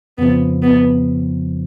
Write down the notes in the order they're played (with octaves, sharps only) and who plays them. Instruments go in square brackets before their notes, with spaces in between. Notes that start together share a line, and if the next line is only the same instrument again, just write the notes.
[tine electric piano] F2 C#3 F3 [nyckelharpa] B3
[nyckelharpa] B3